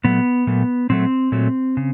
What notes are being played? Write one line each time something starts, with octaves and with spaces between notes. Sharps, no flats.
A#2 F#3 A3 B3
A#2 F#3 A3
A#2 F#3 A3 C4
A#2 F#3 A3
C#3